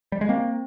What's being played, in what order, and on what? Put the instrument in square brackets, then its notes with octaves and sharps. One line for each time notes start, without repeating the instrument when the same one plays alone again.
[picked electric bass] G3
G#3
[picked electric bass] A#3 [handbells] C4